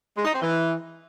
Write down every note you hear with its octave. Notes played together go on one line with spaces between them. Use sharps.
G#3
D#4
C4
E3